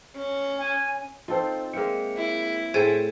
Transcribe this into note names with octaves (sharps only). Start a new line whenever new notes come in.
C#4
G#5
C4 D#4 F4 A4 C5
G#3 A#3 E5 G5 C#7
E4
A2 G#4 A4 C5 E5 G5 G#5